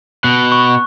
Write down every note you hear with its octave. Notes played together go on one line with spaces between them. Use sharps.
B2 F#6
C#6